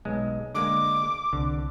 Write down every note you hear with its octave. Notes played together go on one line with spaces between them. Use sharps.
B1 G#3
D3 G#3 A#3 D6
C2 D3